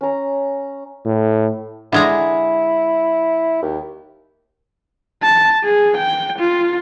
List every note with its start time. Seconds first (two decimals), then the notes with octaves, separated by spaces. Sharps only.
0.01 C#4 A#5
1.05 A2
1.92 D3 G#3 E4 A#5
3.62 D#2
5.22 A5
5.64 G#4
5.97 G5
6.39 F4